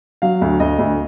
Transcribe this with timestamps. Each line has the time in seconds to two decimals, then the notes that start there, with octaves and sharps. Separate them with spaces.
0.22 F#3 F5
0.42 D2
0.60 D2 D#5
0.79 D2